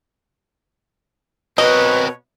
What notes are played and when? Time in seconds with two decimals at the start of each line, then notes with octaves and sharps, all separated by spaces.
1.58 B2 C4 A#4 B4 C#5 D#5